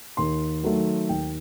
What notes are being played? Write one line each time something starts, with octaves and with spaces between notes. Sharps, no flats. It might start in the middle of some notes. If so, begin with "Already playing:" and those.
D#2 C6
D#3 F#3 A3
D#2 G5